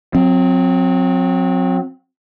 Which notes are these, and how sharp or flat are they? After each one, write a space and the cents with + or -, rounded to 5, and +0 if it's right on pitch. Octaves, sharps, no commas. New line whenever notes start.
F#3 -30 C4 +0